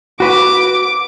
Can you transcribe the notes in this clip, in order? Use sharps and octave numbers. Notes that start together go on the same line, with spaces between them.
F#4 B4 D6